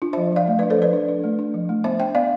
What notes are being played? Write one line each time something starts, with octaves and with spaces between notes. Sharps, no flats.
D4 F4
C5 E5
F3
F3 D5 F5
A3
B4 D5
D4
A4 C5
F3 B4 D5
D4
D4
A3
D4
F3
A3
B3 C5 E5
D4 E5 G5
B3 D5 F5